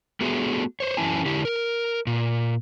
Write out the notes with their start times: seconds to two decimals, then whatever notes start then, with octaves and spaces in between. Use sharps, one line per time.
0.21 A3 B3 F#4 G#4
0.80 C5 C#5
0.97 F#2 E3 C#4 E4 G#5 A5
1.26 D3 E4 G4
1.45 A#4
2.07 A#2